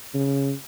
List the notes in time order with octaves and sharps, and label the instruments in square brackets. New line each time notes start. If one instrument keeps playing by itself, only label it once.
[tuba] C#3